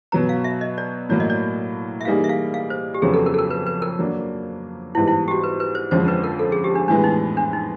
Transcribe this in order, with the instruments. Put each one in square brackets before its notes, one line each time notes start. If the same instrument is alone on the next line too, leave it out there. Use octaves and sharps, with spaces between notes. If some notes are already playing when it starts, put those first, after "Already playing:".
[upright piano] B2 F#3 B3 [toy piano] A#5
[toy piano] F5
E5
D#5
D5
[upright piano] A2 F#3 A#3 [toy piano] D5
[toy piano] D#5
D5
E5
[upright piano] E3 G3 A#3 D#4 G#4 [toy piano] F5
[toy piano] E5
F5
F5
C5
G4
[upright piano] F2 C#3 F#3 B3 [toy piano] G#4
[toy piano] A4
A#4
A4
A#4
B4
B4
A#4
[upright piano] F#3 A#3 D4
[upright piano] G#2 E3 G3 B3 [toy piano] E4
[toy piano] E4
G4
F#4
B4
B4
C5
[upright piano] F2 D3 F3 G#3 C#4 [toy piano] C5
[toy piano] B4
A#4
A4
G#4
G4
D4
[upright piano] A2 E3 G#3 B3 [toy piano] D4
[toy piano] D#4
D4
D#4